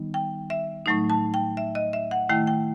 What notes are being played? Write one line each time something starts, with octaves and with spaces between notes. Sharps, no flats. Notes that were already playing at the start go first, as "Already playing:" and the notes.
Already playing: D#3 G3 B3 D#4
G5
E5
A2 F#3 A3 D#4
A5
G5
E5
D#5
E5
F#5
D#3 A3 E4 G5
G5